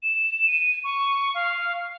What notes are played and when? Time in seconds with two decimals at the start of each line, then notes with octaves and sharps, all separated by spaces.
0.03 E7
0.47 D#7
0.84 C#6
1.35 F5